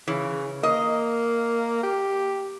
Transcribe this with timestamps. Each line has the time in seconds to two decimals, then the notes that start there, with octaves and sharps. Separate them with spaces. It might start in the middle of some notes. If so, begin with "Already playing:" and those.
0.08 C#3 E3
0.63 A#3 D#5
1.83 G4